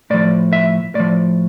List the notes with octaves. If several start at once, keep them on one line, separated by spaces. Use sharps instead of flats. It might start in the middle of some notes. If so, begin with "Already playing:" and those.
A2 F3 D5
E5
A2 F3 D5